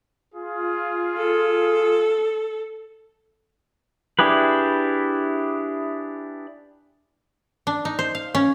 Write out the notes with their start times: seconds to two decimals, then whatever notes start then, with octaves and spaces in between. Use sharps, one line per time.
0.35 F4 G#4
1.17 A4
4.19 D4 E4 G4 G#4 B4
7.67 D4
7.85 D#4
7.99 C5
8.15 F5
8.35 C#4